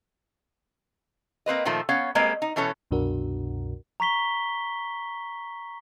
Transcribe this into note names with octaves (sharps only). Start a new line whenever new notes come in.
A#3 C4 B4 D#5
A#2 D#3 F3 A3
B3 C#4 C#5 F5
G3 G#3 A#3 C4 B4 D#5
D#4
B2 E3 C#4 A4 C#5
C2 F#2 B2 D4 F#4 A#4
A#5 C#6 B6 G7